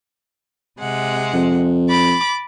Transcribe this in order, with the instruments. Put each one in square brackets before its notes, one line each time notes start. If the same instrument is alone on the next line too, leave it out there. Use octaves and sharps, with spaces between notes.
[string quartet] C3 G#3 F#5
[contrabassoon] F2
[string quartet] B5 D6 A6